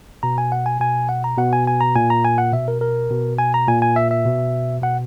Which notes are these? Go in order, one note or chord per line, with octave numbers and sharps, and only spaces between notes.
B2 A#5
G#5
F#5
G#5
B2 G#5
F#5
A#5
B2 F#5
G#5
G#5
A#5
A#2 G#5
A#5
G#5
F#5
B2 E5
A#4
A#4
B2
G#5
A#5
A#2 G#5
G#5
E5
E5
B2
B2 F#5